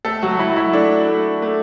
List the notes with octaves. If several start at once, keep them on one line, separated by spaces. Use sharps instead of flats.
A3 A4
F#3 F#4
F#3 E4
E4
A3 D4
A3
A3